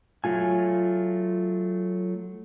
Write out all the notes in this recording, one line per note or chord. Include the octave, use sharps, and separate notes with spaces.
F#3 A3 F4 G#5